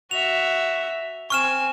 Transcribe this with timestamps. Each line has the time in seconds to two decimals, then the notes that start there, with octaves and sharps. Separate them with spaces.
0.11 F#4 E5 F7
1.30 C4 G#5 C#6 F6 E7